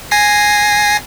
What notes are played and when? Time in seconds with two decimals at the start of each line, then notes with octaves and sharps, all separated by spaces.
0.11 G#5 A#6 C7